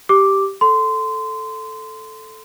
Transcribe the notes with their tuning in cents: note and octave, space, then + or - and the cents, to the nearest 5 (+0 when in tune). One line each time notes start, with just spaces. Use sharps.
G4 -5 D6 +0
A4 +0 C6 -20